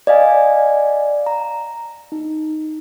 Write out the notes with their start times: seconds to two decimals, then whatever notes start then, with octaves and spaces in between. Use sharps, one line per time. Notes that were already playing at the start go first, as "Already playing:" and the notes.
0.07 D5 D#5 F5 G#5
1.26 A#5
2.12 D#4